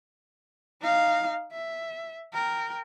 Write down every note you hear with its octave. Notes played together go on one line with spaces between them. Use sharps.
D#4 F5
E5
A#4 G5